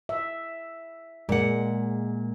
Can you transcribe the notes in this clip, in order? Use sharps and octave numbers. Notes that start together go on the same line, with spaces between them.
E5
A#2 G#3 F#5